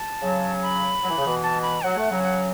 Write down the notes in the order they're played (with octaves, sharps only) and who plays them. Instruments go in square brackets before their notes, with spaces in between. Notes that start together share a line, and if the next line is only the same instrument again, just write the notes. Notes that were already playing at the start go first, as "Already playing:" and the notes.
Already playing: [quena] A5
[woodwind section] C#3 F#3
[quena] B5
[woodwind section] F#3
E3
C#3
B2 E3
[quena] A5
B5
[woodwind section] F#3 [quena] F#5
[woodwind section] A3
C#3 F#3
[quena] F#5